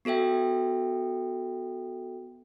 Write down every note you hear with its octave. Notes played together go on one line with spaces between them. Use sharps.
B3 F#4 A4 E5 G5